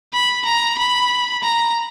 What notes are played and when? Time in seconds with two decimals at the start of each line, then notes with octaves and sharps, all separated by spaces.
0.13 B5
0.45 A#5
0.78 B5
1.43 A#5